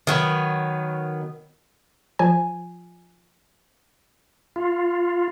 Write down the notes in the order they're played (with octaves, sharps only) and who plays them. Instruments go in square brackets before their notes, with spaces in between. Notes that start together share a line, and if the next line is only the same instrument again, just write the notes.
[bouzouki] D#3 F#3 B3
[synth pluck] F3 G#5
[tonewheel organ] F4